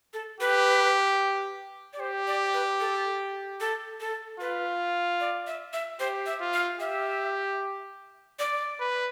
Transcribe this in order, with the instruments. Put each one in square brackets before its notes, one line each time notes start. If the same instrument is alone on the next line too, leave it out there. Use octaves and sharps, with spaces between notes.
[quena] A4
[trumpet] G4 [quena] B4
[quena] D5
[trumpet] G4 [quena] C5
[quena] D5
B4
A4
A4
A4
[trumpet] F4 [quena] B4
[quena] D5
E5
E5
[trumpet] G4 [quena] C5
[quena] E5
[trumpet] F4
[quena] F5
[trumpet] G4 [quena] E5
[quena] D5
[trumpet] B4